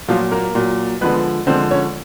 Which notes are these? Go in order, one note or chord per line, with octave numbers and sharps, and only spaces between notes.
A#2 F3 F#3 F4
A#3 A#4
A#2 F#3
D3 F3 G#3 B3 B4
D3 F3 G#3 C4 C5
C#4 C#5